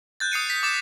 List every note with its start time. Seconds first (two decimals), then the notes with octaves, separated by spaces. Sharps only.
0.20 F#6 G6 A6
0.32 D#6 C7 C#7 D#7
0.50 B6
0.63 D6 D#6 A6 E7